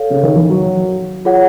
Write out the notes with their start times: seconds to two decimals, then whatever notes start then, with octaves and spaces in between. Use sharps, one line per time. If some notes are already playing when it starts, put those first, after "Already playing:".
Already playing: A4 C#5 F5
0.10 C#3
0.23 D#3
0.35 E3
0.49 F#3
1.25 F4 G#4 C#5 F#5